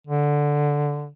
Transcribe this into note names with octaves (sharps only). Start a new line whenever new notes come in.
D3